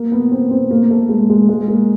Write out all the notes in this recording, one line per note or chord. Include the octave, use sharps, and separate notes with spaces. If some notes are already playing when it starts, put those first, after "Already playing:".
Already playing: A#3
B3
C4
C4
A#3
A3
G#3
G#3
G#3
A#3